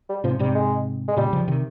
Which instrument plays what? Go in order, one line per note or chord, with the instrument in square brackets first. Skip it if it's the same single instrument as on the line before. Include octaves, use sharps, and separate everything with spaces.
[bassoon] G3
[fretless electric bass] G#2 C3 [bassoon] F3
[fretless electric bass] G#2 C3 [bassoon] G3
[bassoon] G#3
G#3
[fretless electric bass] A#2 C#3 [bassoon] G3
[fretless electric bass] C#3 F3
C3 D#3